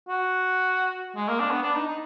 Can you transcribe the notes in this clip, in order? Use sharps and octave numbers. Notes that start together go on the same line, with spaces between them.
F#4
G#3
A#3
D4
B3
D4
D#4
D#4